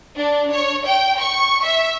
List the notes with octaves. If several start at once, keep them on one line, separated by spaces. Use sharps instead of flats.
D4
C#5
G5
C#6
E5